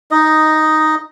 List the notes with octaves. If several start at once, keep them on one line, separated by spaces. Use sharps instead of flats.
D#4 D#5